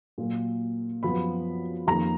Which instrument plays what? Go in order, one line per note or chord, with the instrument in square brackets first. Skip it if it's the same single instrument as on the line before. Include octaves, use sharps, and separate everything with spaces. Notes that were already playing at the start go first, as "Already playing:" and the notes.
[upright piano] A#2 F#3 A#3
F#2 F3 B3 B5
F2 D#3 A#3 A#5